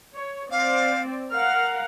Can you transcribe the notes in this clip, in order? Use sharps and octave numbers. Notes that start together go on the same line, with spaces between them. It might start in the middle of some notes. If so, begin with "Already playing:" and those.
C#5
C4 D5 F5
A#4 F5 F#5 F6